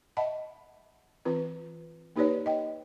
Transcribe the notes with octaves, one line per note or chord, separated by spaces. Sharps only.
D#5 E5 F#5 A5 B5
E3 C4 F4 B4
A#3 D#4 G4 B4 C#5 D5
D#5 G5